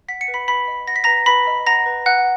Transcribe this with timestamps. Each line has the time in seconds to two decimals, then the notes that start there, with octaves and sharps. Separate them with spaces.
0.08 F#5 B6
0.21 C#7
0.28 B4
0.34 B5 B6
0.48 B4 B5 B6
0.68 D#5
0.87 F#5 A#6
0.96 B6
1.04 B4 A#5 A#6
1.26 B4 B5 B6
1.47 D#5
1.67 F#5 A#5 A#6
1.86 B4
2.06 B4 F#5 F#6